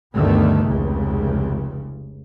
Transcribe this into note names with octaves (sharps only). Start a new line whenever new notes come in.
D2 G2 D3 D#3 A3 B3
F1 C#2 C#3